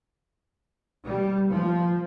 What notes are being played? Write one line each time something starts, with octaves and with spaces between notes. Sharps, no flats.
G3
F3